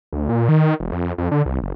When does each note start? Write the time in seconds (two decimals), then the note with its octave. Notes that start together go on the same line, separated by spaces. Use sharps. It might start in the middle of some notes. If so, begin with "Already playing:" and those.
0.13 D2
0.29 A#2
0.49 D#3
0.80 E1
0.92 F2
1.18 F2
1.31 D3
1.46 C2
1.62 F#1